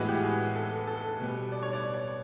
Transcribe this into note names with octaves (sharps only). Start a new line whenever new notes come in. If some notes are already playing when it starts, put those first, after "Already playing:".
Already playing: A2 E3 G#3 B3 F#4
G4
G#4
A4
A4
B2 G3 B3
D5
C#5
D5
C#5
C#5